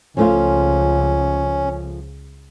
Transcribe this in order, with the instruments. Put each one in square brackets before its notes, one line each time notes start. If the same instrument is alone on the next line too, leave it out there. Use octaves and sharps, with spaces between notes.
[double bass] C#2 [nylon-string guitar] F3 A3 F4 [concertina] C#4